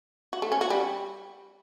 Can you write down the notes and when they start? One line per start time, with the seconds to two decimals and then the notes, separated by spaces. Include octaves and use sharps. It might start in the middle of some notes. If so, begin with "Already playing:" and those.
0.33 F#4
0.42 A3
0.52 C#4
0.61 F#4
0.70 G3